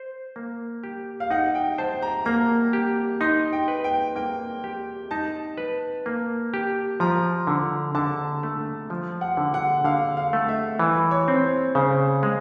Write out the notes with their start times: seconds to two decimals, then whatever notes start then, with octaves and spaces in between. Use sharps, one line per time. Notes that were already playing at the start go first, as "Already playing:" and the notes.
Already playing: C5
0.36 A#3
0.84 G4
1.20 F5
1.31 D#4 F#5
1.55 G5
1.78 C5 A5
2.02 A#5
2.25 A#3 A#5
2.73 G4
3.21 D#4 C6
3.53 G5
3.68 B4
3.84 G5
4.16 A#3 G5
4.64 G4
5.11 D#4 A5
5.58 B4
6.06 A#3
6.54 G4
7.00 F3 A#5
7.47 D3
7.95 D3 A5
8.43 A3
8.90 F3
9.21 F#5
9.37 D3
9.54 F#5
9.85 D3 F5
10.17 F5
10.33 A3
10.48 E5
10.79 E3
11.11 C#5
11.28 C4
11.44 C5
11.75 C#3 C5
12.23 G#3